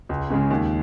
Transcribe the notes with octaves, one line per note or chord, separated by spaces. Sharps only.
C#2
C#3 G#3 C#4
D#2